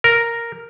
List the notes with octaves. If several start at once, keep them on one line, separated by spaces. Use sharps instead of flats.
A#4